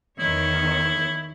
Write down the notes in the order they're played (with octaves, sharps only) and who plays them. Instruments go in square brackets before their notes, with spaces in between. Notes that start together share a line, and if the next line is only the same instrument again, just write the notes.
[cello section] E2 D#3 C#5 [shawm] E4